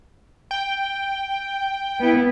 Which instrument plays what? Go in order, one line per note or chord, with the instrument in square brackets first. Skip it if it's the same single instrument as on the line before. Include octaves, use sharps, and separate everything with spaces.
[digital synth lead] G5
[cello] B3 E4